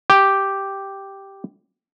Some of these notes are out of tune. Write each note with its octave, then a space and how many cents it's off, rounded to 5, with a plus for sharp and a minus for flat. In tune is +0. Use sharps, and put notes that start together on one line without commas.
G4 +0